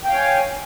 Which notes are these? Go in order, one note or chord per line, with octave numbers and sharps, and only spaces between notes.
C#5 F5 G5 G#5